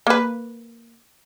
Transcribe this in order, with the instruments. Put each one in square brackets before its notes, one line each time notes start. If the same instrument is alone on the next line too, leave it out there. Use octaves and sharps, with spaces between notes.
[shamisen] A#3 B4